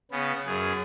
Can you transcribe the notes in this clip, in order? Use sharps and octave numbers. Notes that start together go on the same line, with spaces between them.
C#3 B3
F#2 G#4